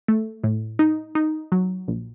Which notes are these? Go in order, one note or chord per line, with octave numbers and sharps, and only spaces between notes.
A3
A2
D#4
D#4
F#3
A#1